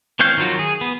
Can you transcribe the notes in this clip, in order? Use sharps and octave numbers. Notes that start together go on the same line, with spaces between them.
E3 C4 C#5 F5 G6
D#3 F3 F#3 F4 F#4
G#4
B3